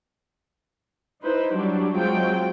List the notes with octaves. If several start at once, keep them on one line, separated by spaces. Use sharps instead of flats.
D#4 E4 B4 C5
F#3 G3 D4 G4
F#3 G#3 C4 F4 G5